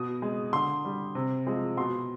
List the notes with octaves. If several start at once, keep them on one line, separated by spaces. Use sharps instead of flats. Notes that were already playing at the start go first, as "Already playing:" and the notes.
Already playing: B2 D#6
G#3
D3 C6
G3
C3
F3 G#3
B2 C6